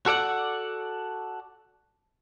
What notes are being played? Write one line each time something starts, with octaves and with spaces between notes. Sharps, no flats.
F#4 A4 D5 F#5